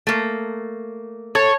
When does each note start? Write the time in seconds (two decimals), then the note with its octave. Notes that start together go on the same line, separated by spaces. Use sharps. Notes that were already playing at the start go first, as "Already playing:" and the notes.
0.07 A3 A#3
1.35 A4 C#5